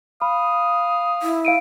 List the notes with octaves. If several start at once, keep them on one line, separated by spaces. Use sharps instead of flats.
F5 B5 D#6
E4
F5 D7 D#7